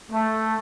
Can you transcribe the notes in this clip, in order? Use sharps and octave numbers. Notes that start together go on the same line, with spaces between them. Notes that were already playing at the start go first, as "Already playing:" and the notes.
A3